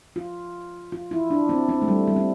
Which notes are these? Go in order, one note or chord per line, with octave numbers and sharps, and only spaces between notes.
F4
F4
E4
D4
C4
C4
A3
G3
G3
C4